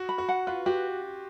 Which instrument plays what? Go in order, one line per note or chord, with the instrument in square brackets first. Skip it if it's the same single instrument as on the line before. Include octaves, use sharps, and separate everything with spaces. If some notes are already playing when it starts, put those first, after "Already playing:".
Already playing: [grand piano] F#4
[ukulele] B5
[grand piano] F#4
[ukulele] F#5
[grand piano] F4 [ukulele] B4
[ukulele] F#4 [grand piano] G4